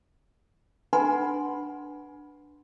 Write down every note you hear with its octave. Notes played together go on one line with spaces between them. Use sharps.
D4 B4 F#5 G#5 B5 C6